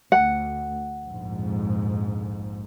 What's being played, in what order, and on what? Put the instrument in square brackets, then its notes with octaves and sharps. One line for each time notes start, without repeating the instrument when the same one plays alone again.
[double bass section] D2 [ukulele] F#5
[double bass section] A#1 F2 G#2